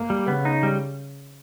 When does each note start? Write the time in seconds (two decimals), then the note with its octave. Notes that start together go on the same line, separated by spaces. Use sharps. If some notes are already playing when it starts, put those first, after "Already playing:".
Already playing: A#3
0.10 G3
0.28 C#3 B3
0.45 D#4
0.63 G3